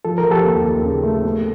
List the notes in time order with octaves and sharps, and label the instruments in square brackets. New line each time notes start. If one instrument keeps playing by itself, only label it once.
[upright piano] F3 [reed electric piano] A4
[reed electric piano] A#4
[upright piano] F3
[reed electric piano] G4 A4
[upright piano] D#2
D#2
C#3
A3
B3